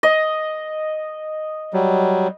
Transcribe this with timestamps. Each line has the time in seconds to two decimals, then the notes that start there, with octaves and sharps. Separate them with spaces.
0.03 D#5
1.74 F#3 G3